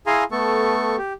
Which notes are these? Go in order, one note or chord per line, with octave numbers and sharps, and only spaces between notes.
E4 G#4 F5 G#5 A#5 C6
A3 B3 A4 C#6
G4